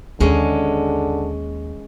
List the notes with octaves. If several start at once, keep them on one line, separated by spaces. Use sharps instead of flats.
D#2 D3 G#3 C#4